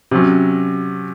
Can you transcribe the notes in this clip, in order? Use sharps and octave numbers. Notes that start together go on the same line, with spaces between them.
C3 F#3 C#4